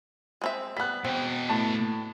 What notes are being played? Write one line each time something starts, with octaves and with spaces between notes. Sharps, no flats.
G#3 C4 E5
G3 B3 F#6 B6
B2 C4 G5
A2 A5